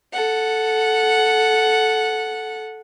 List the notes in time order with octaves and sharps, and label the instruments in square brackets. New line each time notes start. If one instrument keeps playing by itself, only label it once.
[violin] A4 F#5